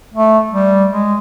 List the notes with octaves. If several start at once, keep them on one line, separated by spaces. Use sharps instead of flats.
A3
G3
G#3